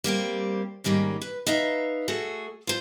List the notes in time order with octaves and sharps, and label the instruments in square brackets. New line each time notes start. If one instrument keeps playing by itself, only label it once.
[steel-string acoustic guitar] G3 A#3 C4 G4
G#2 D#3 G3 A#3 C#4
B4
D#4 B4 E5 F5
A3 F#4 G#4 A4
F4 C5